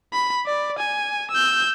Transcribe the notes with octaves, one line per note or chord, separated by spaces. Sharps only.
B5
D5
G#5
E6 G6